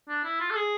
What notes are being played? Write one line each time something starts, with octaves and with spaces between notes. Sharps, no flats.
D4
E4
F4
A4
G#4